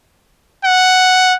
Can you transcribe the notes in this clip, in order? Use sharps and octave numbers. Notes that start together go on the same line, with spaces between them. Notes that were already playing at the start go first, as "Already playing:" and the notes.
F#5